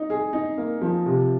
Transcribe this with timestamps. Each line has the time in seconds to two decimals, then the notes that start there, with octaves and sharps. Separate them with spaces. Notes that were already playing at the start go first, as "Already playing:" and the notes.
Already playing: D#4
0.10 G#4
0.33 D#4
0.58 A#3
0.81 F3
1.06 C3